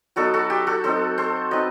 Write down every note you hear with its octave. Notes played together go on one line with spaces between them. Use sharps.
F#3 B3 D#4 F#4 A4
F#4 A4
G4
F#4 A4
F#3 C4 D#4 A4 C5
A4 C5
F#3 C4 D#4 B4 D#5